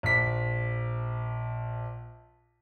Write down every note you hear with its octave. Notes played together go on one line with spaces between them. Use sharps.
A#1 B6